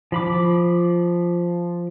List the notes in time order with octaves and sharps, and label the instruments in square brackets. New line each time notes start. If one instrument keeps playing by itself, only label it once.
[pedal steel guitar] F3 B5 D6